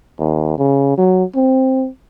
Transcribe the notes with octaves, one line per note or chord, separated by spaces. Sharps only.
D#2
C#3
F#3
C4